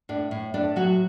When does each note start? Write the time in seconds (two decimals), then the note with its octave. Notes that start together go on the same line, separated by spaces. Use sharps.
0.09 A2 D4
0.31 A2
0.54 A2 D4
0.76 F#3 F#4